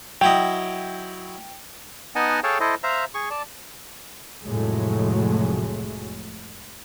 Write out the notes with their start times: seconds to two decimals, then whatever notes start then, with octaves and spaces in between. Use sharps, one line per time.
0.21 F#3 E4 D#5 G5
2.15 B3 D#4 D#5 F#5 G#5 A5
2.43 G#4 A4 C#5 F5 G5 A5
2.60 E4 A4 C5 D#5
2.83 C5 E5 F5 A#5
3.14 G#4 C#6
3.31 D5 A5
4.43 F1 A2 F#3 G#3 A3